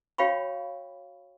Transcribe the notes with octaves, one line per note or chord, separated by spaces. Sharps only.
F#4 C#5 F5 G5 B5 C#6